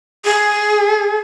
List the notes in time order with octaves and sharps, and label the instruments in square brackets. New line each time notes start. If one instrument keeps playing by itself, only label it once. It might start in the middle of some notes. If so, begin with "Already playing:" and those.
[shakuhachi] G#4